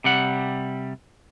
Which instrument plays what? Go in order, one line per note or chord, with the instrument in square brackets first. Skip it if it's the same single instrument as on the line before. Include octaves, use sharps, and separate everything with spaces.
[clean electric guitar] C3 G3 F#5